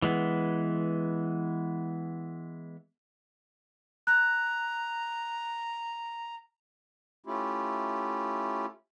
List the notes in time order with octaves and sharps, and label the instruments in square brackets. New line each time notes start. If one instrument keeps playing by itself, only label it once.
[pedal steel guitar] E3 G#3 B3
[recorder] A#5 [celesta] F#6
[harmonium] A3 C#4 E4 F4 G4